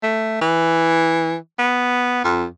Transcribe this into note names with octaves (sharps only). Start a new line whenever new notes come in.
A3
E3
B3
F2